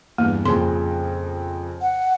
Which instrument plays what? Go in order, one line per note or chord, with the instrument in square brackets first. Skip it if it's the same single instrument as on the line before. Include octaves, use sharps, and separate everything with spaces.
[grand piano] E2 G2 [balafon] A#3
[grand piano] F2 A#2 C#3 [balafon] C6
[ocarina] F#5